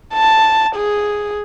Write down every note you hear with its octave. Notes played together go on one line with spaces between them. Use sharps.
A5
G#4